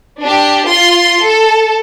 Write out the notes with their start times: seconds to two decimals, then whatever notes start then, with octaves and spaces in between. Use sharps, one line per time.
0.19 D4 G4
0.66 F4 C6
1.21 A4